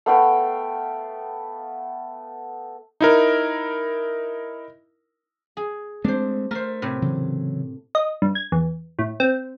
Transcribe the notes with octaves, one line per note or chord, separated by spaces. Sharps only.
A3 B3 F5 G5
D#4 E4 A#4
G#4
G#3 A3 C4 D4 C5
A3 A#4 C5
A2 C3
C#3 E3 F#3
D#5
G2
G#6
E2
A2
C4